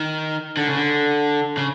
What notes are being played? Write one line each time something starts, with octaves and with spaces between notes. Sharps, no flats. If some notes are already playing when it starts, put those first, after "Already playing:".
Already playing: D#3
D3
C#3
D3
C#3